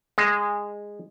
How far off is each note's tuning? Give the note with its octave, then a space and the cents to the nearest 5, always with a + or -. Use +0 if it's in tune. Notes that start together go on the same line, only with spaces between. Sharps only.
G#3 -10